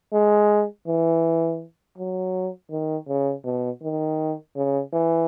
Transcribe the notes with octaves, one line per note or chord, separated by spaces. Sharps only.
G#3
E3
F#3
D#3
C#3
B2
D#3
C#3
E3